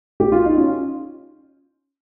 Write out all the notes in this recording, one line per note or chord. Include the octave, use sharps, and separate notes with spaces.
G4
F4
D#4
C#4 F4